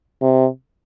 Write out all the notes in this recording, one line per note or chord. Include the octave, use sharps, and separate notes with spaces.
C3